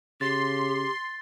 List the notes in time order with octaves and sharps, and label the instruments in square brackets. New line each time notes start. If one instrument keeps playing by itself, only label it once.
[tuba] C#3 [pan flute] G4 [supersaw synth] C6 [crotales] A6